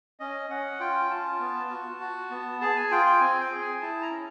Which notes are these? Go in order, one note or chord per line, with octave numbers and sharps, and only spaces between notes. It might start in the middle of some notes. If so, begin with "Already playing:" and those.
C#4 D#5
C#4 F#5
F4 G5
F4 A5
B3
F#4
F#4
B3
G#4 A5
G#5
F4 G5
G5
C4 G#5
G5
G#4
G#5
E4 A5
A#5
C#4